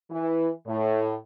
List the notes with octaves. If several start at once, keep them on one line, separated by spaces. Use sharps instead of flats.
E3
A2